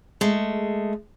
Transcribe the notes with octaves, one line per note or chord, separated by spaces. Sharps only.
G#3 A3